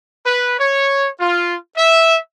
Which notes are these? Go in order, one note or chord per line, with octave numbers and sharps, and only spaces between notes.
B4
C#5
F4
E5